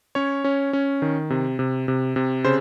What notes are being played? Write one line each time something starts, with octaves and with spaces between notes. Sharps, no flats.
C#4 C#5
C#4
C#4
D#3
C3
C3
C3
C3
C#3 C5